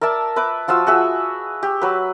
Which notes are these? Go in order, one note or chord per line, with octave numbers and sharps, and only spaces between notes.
A#4 D5 E5 A5
B4 E5 D6
F3 F4 F#4 E6
F#4 G#4 E5
G4
F#3 B4